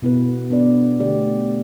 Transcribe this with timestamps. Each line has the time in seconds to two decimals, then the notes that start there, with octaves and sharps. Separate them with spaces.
0.02 B2 B3 E4 B4
0.50 B3 D4 B4 D5
1.00 D3 A3 G4 D5